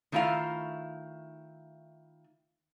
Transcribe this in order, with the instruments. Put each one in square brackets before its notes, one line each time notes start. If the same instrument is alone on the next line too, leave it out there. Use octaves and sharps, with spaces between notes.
[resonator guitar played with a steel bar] D#3 A3 E4 F4 F5